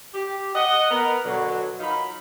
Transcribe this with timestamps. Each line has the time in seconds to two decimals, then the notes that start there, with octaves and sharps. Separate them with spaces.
0.14 G4
0.55 D#5 F#5
0.91 B3 A#4
1.25 B2 D3 F#3
1.80 F#3 D#4 F4 A#4 B5